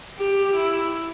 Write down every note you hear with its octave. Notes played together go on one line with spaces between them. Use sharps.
G4
E4